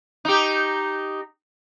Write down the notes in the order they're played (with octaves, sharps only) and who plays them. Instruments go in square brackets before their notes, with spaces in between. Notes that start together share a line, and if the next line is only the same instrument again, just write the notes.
[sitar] D#4 G4